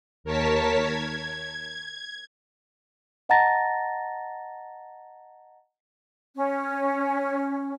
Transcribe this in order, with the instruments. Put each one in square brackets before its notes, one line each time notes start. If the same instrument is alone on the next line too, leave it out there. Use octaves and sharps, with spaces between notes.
[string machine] D#2 A#4 C#5 A5 B6
G#6
[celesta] D#5 F#5 A5 A#5 A6 A#6
[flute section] C#4